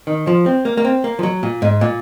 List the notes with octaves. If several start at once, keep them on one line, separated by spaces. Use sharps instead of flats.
D#3
F3
C4
A#3
A#3
C4
A#3
F3
F#3
A#2
G#2
A#2